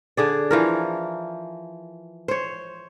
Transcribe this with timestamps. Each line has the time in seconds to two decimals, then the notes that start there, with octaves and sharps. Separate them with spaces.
0.17 D3 G#4 D5
0.51 E3 F3 A#4
2.28 C5 C#5